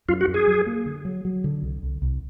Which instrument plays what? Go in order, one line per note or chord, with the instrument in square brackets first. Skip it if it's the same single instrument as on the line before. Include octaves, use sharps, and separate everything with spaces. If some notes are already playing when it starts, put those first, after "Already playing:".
[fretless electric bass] F#2 [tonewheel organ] F4
[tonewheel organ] F#4
[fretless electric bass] F#2
[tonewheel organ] G#4
[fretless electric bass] F#3
A#3
D3
F#3
F#3
D3
C2
C2
C2